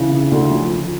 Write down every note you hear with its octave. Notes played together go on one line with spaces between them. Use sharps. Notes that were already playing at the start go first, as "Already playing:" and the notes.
Already playing: C#3 E3
C#3
D2
F3
F3